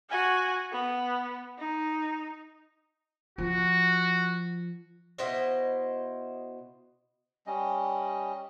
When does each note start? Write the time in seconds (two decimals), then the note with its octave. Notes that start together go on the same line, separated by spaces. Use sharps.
0.10 F#4 G#5
0.72 B3
1.58 D#4
3.38 F3 F#4
5.18 B2 E4 C5 D#5
7.47 G3 C#4 D#5